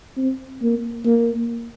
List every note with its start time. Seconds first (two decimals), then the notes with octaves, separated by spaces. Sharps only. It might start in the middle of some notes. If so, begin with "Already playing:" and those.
0.17 C4
0.62 A#3
1.05 A#3